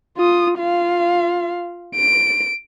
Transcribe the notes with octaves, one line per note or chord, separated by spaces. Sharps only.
F4 D#6
F4 F5
D7